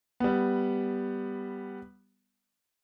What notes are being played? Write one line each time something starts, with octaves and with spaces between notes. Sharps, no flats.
G3 B3